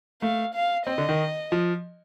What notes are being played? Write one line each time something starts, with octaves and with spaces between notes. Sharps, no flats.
A3 F5
F5
C4 D#5
D3
D#3
F3